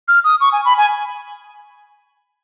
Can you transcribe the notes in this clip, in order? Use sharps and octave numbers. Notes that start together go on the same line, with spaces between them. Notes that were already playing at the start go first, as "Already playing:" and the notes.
F6
D#6
C#6
G#5
B5
G#5